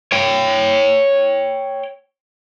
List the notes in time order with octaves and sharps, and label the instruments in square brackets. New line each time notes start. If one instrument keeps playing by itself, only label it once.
[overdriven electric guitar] C#5 G5